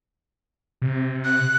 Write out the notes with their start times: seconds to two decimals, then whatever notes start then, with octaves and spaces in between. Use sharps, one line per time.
0.82 C3
1.25 F#6